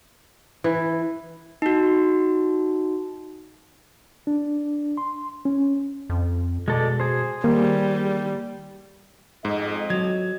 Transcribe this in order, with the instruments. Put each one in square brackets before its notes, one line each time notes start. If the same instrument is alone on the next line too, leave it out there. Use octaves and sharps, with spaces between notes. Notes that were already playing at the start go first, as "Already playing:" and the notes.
[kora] E3
[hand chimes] D#4 F#4
[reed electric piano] D4
C6
C#4
[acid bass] F2
[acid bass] B2 [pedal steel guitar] G#3 A4 D5
[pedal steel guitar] G#4 C5
[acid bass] D#3 [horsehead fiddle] G3 [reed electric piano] A#3
[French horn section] F2 D#5 [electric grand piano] G#2
[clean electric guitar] F#3 [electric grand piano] G#6